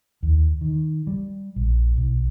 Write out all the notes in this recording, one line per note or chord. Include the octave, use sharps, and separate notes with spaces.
D#2
D#3
G3
A#1
B1